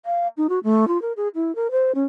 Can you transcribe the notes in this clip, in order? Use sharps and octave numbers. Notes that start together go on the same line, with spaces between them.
F5
D#4
F#4
A3
F4
A#4
G#4
E4
A#4
C5
C#4